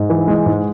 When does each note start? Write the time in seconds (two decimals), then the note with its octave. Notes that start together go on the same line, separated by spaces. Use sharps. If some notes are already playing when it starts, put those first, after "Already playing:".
Already playing: G#2
0.10 E3
0.28 G#3
0.46 G#2